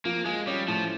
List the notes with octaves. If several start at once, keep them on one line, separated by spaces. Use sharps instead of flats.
F3 A#3
F3 G#3
G3 C#4
A2 F3